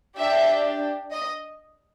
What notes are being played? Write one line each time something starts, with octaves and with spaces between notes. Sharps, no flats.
D4 G4 E5
D#5